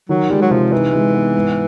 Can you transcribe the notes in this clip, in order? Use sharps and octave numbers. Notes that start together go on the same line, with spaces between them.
D#3 F#3
G3 G#3
F#3
C3 F3
E3 D#4
G#3
B3
G#2